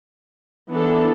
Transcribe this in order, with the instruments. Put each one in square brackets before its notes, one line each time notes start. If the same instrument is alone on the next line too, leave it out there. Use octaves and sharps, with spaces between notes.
[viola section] E3 B3 D4 A4